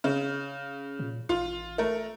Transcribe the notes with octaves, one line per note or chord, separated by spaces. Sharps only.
C#3
A#2
A1 F4
A3 A#4